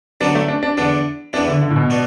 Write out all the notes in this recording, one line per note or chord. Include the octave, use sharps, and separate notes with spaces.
D3 F#3 B3 D4 F#4
A3
D4
D4
E2 D3 B3 D4
E2 E3 B3 D4 E4
D3
D3
A2
B2
B3 D4 F#4